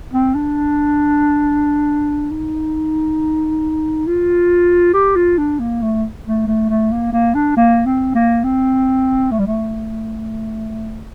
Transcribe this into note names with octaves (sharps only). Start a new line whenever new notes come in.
C4
D4
D#4
F4
G4
F4
D4
A#3
A3
A3
A3
A3
A#3
A#3
D4
A#3
C4
A#3
C4
A3
G3
A3